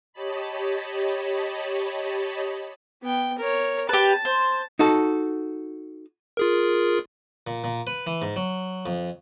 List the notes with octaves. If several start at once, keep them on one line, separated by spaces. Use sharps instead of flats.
G4 C#5 D#5 A5 B5
B3 G5
A#4 C#5
G4 B4 A5
C5
D#4 F#4 A4
F4 G#4 A#4
A#2
A#2
B4
E3
G#2
F#3
F2